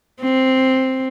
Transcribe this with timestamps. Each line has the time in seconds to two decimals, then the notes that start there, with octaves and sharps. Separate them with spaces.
0.22 C4